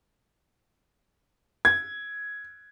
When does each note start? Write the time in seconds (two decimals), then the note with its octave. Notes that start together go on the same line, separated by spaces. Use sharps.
1.65 G#6